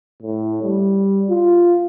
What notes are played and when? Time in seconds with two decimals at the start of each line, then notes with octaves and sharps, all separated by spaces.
0.22 A2
0.63 G3
1.29 F4